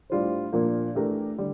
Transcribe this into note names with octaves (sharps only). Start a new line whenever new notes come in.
A2 G3 D4 F4 C5
A#2 F3 A#3 D4
E3 A3 D4 G4 A#4
D3 G3